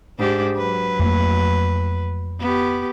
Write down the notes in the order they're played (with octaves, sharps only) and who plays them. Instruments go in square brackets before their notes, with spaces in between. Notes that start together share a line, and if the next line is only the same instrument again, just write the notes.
[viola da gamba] G#2 D4 G4
F#3 B4
[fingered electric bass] F2 A3 A#3
[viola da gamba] B3 G4